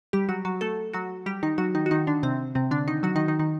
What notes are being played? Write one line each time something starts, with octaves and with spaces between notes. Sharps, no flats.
G3 G4
F#3 F#4
F#3 F#4
A3 A4
F#3 F#4
G3 G4
D#3 D#4
F#3 F#4
D#3 D#4
F#4
D#3 D#4
D3 D4
C3 C4
C3 C4
D3 D4
D#3 D#4
F#3 F#4
D#3 D#4
D#3 D#4
D#3 D#4